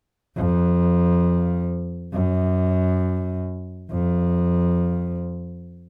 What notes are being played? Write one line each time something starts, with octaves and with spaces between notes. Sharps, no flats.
F2
F#2
F2